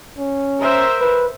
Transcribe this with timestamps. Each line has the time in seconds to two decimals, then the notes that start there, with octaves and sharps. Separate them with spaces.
0.18 C#4
0.60 A#4 C5 E5
1.00 B4